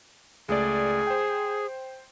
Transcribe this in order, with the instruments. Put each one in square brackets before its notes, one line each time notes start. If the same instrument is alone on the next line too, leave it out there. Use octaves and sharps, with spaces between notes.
[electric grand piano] C#2 A3 D5 [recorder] G#4
[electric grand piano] C5 G5